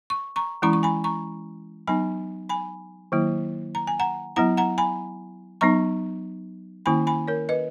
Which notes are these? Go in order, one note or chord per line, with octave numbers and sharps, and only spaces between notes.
C#6
A#5 C#6
E3 G#3 C#4 E4 A#5 C#6
C#6
G#5 B5
A#5 C#6
F#3 B3 D#4 G#5 B5
G#5 B5
D#3 F#3 A#3 E4
A#5
G#5
F#5 A#5
F#3 B3 E4 F#5 A#5
F#5 A#5
G#5 B5
F#3 B3 D#4 A#5 C#6
D#3 A#3 C#4 E4 G#5 B5
G#5 B5
A#4 C#5
B4 D#5